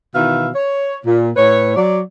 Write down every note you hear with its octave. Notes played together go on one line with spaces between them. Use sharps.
B2 D#3 E3 B4 E5 F5
C#5
A#2
A2 B4 C#5
F#3 D5